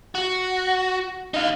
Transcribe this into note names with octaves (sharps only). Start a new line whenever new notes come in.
F#4
D#4 F5